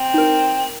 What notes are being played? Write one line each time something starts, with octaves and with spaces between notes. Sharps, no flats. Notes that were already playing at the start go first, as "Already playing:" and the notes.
Already playing: C4
D#4 A#4